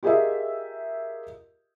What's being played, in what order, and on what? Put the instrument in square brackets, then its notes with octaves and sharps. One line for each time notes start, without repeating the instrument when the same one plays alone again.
[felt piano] F4 G4 G#4 A#4 D#5 E5